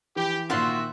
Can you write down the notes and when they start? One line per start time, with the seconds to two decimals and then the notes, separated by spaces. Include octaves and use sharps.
0.16 E3 G4
0.50 A#2 D#3 C4 F4 F#4 E5 F#5 C6